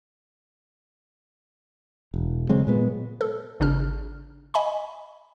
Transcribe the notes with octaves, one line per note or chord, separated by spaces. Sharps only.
E1
C#3 F#3 G#3 C4
A#2 G#3 B3
A4
G#1 C#3 D4 F6
D#5 G#5 B5